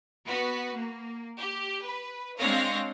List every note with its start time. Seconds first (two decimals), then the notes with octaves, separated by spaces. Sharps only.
0.27 B3 F#4 B4
0.75 A#3
1.38 G4
1.84 B4
2.38 G#3 C4 D4 C#5 F5 A#6